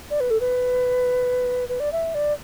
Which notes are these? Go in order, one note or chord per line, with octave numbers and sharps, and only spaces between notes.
D5
B4
A4
B4
B4
D5
E5
D5